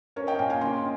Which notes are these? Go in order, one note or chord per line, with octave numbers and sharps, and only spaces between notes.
C#4 A#4 C#5
D#5 G5
A#2 F5 G#5
F5 G#5
C#3 G#5 C6